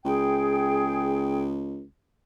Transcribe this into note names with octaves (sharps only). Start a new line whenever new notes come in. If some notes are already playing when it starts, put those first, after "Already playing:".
C#2 G#4 G5